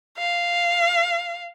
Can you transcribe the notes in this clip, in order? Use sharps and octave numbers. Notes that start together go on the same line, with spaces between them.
F5